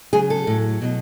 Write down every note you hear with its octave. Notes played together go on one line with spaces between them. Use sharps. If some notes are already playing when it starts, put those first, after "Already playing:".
C#3 F#3 G#4
A4
A2 F#3
B2 F#3